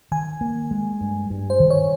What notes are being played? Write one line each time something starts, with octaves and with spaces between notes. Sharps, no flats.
D#3 G#5
A#3
G#3
G2
G2
C5
D#3
C#5